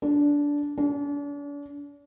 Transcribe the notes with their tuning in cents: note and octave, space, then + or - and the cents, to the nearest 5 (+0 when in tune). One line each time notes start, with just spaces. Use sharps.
D4 -15
D4 -40